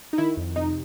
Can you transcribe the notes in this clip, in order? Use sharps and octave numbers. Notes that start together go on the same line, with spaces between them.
D#4
D#3 E4
F2
C3 D#4